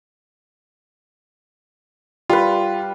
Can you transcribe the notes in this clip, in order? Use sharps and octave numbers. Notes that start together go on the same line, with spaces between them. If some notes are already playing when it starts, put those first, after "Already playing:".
G3 F4 B4